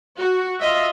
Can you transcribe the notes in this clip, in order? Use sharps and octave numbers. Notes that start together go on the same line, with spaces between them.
F#4
F4 D#5 E5